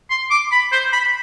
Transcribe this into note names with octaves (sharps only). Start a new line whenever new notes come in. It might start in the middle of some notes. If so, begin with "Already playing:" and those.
C6
D6
B5
C5
B5